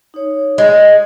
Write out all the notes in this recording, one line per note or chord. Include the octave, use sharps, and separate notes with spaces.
D#4 C#5
G#3 G#4 D#5